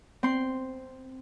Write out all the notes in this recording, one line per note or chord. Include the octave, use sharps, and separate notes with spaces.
C4 C6